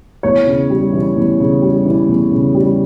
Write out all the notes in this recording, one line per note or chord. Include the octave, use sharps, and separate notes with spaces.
E2 C#5
C#3
G3
E3
E2
C#3
G3
E3
E2
C#3
G3